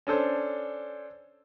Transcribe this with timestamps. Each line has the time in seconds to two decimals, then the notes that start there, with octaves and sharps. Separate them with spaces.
0.07 C#4 D4 A4 C5